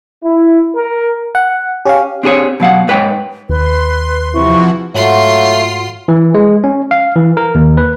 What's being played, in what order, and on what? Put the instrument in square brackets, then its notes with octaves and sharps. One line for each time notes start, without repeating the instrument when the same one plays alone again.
[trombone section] E4
A#4
[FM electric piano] F#5
[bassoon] C#4 [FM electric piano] G4 F5
[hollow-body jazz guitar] C4 D4 G4 G#4 B4 C#5
B2 F#3 F5 F#5
G#2 B4 C#5 G5
[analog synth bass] D#2 [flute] B4 [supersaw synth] C6
[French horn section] C3 E4 [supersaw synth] E3 F3 F#4 [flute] C#6
[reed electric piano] G#2 F#4 F#5 [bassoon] F#3 [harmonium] A3 [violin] F4 C6
[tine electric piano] E3
G#3
C#4
F5
E3
A#4
D#2
B4